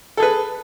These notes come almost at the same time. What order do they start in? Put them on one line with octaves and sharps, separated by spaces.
A4 G#4 B4